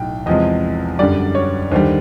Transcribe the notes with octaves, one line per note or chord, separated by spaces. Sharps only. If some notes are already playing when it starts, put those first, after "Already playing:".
Already playing: B1 A2 F#3 G5
E2 C3 F3 G#3 D#5
F#2 D3 G3 D5
C#5
D#2 D3 G3 C5